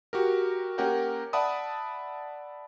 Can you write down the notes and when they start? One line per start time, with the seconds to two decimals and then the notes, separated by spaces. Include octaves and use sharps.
0.13 F#4 G4 A#4
0.78 A#3 C#4 G4 A#4 F#5 G5
1.33 D5 E5 F#5 A5 B5 D#6